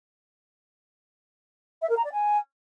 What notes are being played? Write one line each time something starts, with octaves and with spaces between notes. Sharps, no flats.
E5
A#4
A#5
D5
G#5